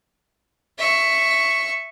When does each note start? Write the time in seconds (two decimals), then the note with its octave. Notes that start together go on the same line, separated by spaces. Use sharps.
0.79 E5 C#6